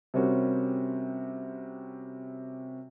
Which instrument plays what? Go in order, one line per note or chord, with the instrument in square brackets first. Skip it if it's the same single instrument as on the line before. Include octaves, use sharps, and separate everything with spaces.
[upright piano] C3 G3 C4 C#4 F#4 A#4